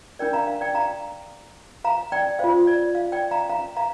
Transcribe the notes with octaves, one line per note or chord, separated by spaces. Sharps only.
D4 A#4 D5 G5
F5 A#5
F5
D5 G5
F5 A#5
F5 A#5
D5 G5
F4 C5 F5
D5
F5
D5 G5
F5 A#5
F5 A#5
F5 A#5